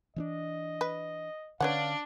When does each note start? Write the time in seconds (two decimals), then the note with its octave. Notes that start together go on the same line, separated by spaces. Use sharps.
0.16 E3 C#4 D4 D#5
0.81 B4
1.60 D3 C#4 D4 B4 C#5 F5 F#5